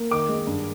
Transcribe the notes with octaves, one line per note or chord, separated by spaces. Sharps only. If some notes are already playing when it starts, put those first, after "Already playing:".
Already playing: A#3
D#3 D6
G#3
G2